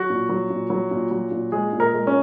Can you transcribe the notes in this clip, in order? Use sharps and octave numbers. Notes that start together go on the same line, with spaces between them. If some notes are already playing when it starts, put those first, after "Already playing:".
Already playing: F#3 F#4
A#2
F#3
A#2
F#3
A#2
F#3
A#2
G#3 G#4
A#2
A#4
G#3
C#4